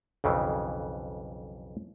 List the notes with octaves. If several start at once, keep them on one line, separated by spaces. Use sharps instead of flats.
B1 F2 C#3 E3